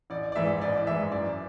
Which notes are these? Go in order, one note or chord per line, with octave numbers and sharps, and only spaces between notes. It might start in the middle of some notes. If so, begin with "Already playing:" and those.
A1 D5
D5
G#2 E3 E5
A1 D5
G#2 E3 E5
F#2 D5